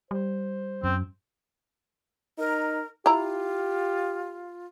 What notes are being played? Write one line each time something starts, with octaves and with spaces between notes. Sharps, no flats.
G3 C5
F#2 C4
D#4 A#4
E4 F4 G4 A#5